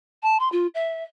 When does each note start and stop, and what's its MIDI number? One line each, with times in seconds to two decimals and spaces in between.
0.23 0.38 81
0.40 0.50 84
0.52 0.67 65
0.75 1.03 76